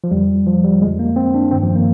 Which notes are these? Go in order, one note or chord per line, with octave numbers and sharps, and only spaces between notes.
F3
F2 D3 G3
F3
G3
F2 D3 G#3
A#3
C4
D4
G2 D#3 C4
F3
A#3